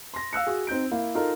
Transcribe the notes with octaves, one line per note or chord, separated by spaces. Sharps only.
C6 A#6
F5 E6 F#6 C#7
F#4 G#4
C4 D#4 G6 D7
A#3 E4 F5
D#4 F4 A4 A#4 D#5